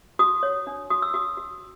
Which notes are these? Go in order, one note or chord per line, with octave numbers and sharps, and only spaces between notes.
F#4 D#6
C#5
D4
F#4 D#6
E6
F#4 D#6
F#4